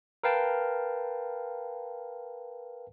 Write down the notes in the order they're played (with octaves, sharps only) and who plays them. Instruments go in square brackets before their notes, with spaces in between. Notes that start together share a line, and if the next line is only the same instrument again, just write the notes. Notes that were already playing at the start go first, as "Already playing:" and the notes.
[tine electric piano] A#4 B4 F5 G5 A5